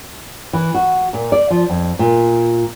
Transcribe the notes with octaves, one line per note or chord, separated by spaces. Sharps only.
E3
F#4
A#2
D5
F3
F2
A#2